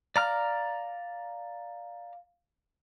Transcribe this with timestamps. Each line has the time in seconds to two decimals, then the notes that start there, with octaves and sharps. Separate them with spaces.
0.16 D5 F5 A#5 F6